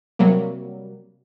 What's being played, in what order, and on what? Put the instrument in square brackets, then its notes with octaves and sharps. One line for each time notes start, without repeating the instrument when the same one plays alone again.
[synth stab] C3 F#3 G3 A#3